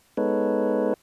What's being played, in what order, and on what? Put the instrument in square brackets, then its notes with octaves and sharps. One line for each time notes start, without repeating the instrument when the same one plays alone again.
[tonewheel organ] G#3 B3 D#4 A4 B4 C#5